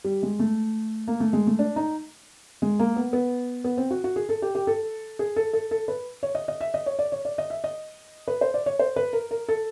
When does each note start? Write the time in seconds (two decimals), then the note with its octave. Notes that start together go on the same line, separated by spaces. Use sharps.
0.04 G3
0.23 G#3
0.39 A3
1.08 A#3
1.20 A3
1.33 G#3
1.47 A3
1.59 D4
1.76 D#4
2.62 G#3
2.79 A#3
2.96 B3
3.13 B3
3.64 B3
3.77 C4
3.91 F#4
4.04 F#4
4.16 G#4
4.29 A4
4.42 G4
4.55 G4
4.67 A4
5.19 G#4
5.36 A4
5.53 A4
5.71 A4
5.88 B4
6.23 C#5
6.35 D#5
6.48 D#5
6.61 E5
6.74 D#5
6.86 C#5
6.99 D5
7.12 C#5
7.25 D5
7.38 D#5
7.50 E5
7.64 D#5
8.28 B4
8.41 C5
8.54 D5
8.66 C#5
8.79 C5
8.96 B4
9.13 A#4
9.31 A#4
9.49 A4